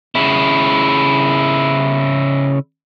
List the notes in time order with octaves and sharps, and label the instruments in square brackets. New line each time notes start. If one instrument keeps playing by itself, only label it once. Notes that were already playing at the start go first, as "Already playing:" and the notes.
[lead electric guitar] C#3 E4